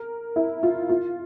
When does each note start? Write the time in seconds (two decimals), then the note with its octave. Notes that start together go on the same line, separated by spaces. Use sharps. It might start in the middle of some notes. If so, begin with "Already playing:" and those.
Already playing: A#4
0.36 E4
0.63 F4
0.89 F4